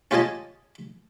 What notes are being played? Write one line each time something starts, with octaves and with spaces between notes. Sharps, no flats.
C#4 F4 G4 D#5 G#5 A5